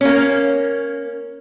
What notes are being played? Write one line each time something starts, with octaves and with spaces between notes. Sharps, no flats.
A#3 C#4